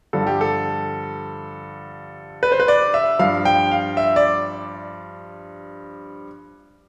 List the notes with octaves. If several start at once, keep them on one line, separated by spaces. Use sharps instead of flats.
G2 D3 F3 A4
G4
A4
B4
C5
B4
D5
E5
G2 F3 F5
G5
F5
E5
D5